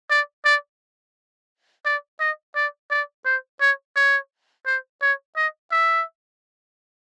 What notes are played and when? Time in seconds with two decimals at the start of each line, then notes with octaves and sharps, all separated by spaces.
0.10 D5
0.45 D5
1.86 D5
2.20 D#5
2.56 D5
2.91 D5
3.25 C5
3.61 C#5
3.96 C#5
4.66 C5
5.02 C#5
5.36 D#5
5.72 E5